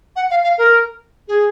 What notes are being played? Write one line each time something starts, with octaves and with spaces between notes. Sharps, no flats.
F#5
F5
F5
A#4
G#4